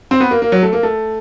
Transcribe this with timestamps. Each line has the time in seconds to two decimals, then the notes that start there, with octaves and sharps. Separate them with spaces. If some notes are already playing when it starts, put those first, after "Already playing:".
0.11 C4
0.20 B3
0.31 A#3
0.42 A#3
0.52 F#3
0.63 A3
0.73 A#3
0.83 A3